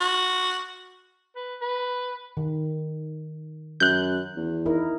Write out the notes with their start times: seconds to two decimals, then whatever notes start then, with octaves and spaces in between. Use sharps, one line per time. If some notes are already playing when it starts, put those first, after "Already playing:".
0.01 F#4
1.36 B4
1.61 B4
2.37 D#3
3.80 F#2 F#6 G6
4.36 E2
4.66 D#4 E4 A#4